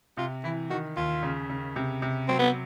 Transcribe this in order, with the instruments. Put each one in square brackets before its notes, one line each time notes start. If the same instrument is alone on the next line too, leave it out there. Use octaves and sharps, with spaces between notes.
[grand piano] C3 [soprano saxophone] F4
[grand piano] E3 [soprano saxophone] E4
[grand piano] D#3 [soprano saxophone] F#4
[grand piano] D#2 [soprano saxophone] F4
[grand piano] C#3
C#3
C3
C3
[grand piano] F#3 [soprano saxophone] C4
[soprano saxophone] B3